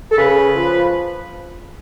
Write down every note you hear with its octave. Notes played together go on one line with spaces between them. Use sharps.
A4
C#3 B4
F3